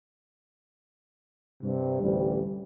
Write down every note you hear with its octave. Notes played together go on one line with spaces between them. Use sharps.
G2 C3
A1 D2 G3